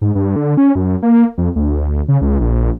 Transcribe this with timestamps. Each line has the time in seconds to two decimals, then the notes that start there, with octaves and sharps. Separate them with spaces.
0.01 G#2
0.15 G2
0.36 D3
0.57 C#4
0.75 F#2
1.03 A#3
1.38 F2
1.56 D2
2.08 C#3
2.21 C#2
2.40 A#1